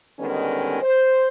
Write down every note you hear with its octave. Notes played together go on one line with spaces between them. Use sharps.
D3 D#3 G3 G#3 B3 C#4
C5